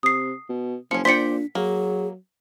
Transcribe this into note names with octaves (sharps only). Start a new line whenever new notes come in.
C3 D#6 C7
B2
F#1 F3 C#4 C#7
A#2 D4 C5 D5 G5 B6 C#7
F#3 A#3 G#4